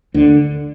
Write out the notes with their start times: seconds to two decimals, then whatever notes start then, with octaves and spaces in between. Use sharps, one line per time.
0.14 D2 D3